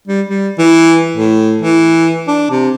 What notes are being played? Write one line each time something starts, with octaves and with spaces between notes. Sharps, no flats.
G3
G3
E3
A2
E3
D4
C3